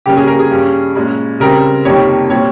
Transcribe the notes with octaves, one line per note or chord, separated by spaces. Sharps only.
C#3 G3 A#3 C#4 G4
G#4
A#4
G#4
G2 G3 C#4
A#2 G#3 C#4
C#3 G3 C4 A#4
F2 C3 D#3 G3 A#3 C#5
A#2 G3 C4 C#5